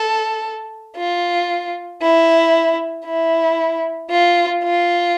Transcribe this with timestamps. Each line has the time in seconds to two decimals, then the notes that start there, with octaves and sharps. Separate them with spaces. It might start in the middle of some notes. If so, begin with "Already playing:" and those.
Already playing: A4
0.97 F4
2.02 E4
3.05 E4
4.10 F4
4.64 F4